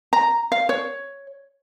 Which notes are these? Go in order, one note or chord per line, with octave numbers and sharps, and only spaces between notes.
A#5
F5
C#5